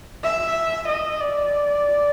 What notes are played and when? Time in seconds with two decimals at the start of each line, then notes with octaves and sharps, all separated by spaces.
0.24 E5
0.88 D#5
1.20 D5